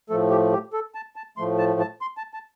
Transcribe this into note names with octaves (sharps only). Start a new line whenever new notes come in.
A2 F3 A3 A4
G4
G4
A4
A5
A5
A2 F3 A3 C6
A5
A5
C6
A5
A5